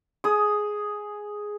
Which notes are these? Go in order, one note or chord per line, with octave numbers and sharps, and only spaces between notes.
G#4 D#6